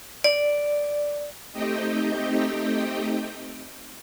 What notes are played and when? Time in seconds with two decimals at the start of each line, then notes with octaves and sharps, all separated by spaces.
0.24 D5
1.52 A3 C4 D#4 G4 D#5 G5